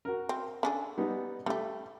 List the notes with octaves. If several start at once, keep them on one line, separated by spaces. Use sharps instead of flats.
F#4 A#4
C4
C#4 D4 G#4 A4
G3 B3 D#4
G3 A3 G4